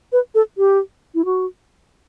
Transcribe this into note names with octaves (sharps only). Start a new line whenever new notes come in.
B4
A4
G4
E4
F#4